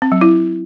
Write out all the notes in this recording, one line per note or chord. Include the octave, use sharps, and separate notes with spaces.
C4
F#3
E4